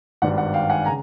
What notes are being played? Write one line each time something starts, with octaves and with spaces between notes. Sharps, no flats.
G#1 G2 D#3 G3 F#5
F#5
F5 G5
F#5 G#5
C#3 G#5 A#5